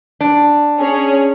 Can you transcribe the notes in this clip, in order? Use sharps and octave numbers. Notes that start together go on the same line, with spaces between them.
D4
C#4 G#4 C#5